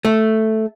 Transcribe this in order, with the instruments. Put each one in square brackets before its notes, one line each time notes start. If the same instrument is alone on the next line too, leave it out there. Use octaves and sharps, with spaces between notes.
[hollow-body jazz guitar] A3